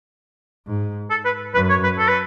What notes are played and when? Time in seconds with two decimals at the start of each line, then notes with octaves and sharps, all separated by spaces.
0.67 G#2
1.10 A4
1.25 B4
1.54 F#2 B4
1.70 C#5
1.84 B4
1.99 A4
2.08 B4